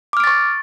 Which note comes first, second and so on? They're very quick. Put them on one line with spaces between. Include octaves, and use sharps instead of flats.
D6 F6 D7 A6 C#6